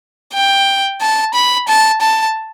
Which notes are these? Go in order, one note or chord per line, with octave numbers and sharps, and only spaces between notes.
G5
A5
B5
A5
A5